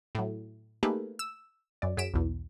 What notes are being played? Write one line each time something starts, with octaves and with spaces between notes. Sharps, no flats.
A2 F#3
A3 A#3 D#4 G4 G#4 B4
E6
F#2 D5
F#2 F#3 G#4 B6 D7 E7
B1 E2